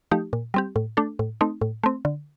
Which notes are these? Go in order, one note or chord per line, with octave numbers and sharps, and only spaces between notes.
F3 A3 D#4 G4
A#2
G3 C4 G4
A2
A3 D4 A4
A2
A3 C4 D#4
A2
A3 C4
D3